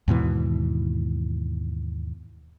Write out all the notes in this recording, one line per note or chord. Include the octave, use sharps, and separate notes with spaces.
D#2 G#2 B2 E3